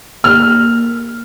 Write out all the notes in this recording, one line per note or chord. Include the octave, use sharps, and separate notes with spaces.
A#3 F6